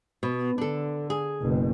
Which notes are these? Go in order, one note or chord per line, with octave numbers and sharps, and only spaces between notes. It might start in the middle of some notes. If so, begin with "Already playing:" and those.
B2
D3 D4 A4
G#4
F#1 B2